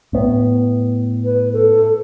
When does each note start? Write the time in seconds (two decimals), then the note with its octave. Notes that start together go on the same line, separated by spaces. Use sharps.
0.13 A2 B3
1.24 B4
1.53 A4